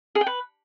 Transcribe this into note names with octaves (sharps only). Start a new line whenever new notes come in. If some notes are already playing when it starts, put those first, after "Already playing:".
G#4
G5
B4